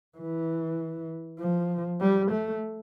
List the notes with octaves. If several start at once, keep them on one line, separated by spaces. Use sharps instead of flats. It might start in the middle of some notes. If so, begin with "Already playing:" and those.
E3
F3
G3
A3